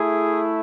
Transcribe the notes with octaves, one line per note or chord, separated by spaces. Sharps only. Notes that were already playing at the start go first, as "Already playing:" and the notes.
Already playing: A3 E4 G#4